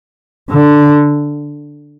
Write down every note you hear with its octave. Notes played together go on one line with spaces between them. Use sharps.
D3